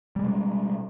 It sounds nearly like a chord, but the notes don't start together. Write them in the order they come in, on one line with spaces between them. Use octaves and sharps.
G3 G#3 B2